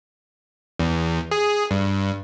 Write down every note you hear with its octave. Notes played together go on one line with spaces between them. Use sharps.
E2
G#4
G2